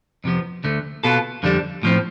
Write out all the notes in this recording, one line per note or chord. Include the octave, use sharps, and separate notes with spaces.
F2 C3 F3 B3
D2 D3 A3
B2 B3 F4 A4
F2 D3 G3 D4
A2 F3 C4